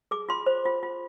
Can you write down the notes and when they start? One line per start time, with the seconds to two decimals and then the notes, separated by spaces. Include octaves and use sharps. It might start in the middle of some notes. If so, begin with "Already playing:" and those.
0.11 G#4 D6
0.29 F4 C6
0.46 C5
0.65 F4
0.83 F4